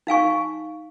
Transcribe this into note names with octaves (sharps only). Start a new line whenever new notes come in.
D#4 F5 G#5 C#6